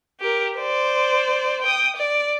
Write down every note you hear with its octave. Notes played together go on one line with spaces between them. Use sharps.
G4 A#4
C5 D5
G5 D#6
D5